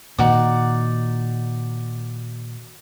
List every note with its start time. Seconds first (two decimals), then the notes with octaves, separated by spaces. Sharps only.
0.18 A#2 D#3 D#4 F#4 D5